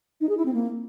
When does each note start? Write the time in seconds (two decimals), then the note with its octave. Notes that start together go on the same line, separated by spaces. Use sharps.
0.21 D#4
0.29 G#4
0.37 E4
0.46 C4
0.54 A#3